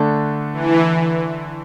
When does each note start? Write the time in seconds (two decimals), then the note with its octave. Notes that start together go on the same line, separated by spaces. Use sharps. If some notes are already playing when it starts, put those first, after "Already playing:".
Already playing: D3 A3 D4 A4
0.53 E3